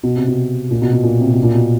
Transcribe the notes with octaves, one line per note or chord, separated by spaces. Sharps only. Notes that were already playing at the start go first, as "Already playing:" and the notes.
B2
C3
B2
A#2
B2
B2
A#2
C3
B2
A#2
B2